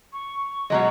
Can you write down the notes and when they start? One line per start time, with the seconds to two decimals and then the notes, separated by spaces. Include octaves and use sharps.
0.13 C#6
0.70 B2 F#3 G#3 D#5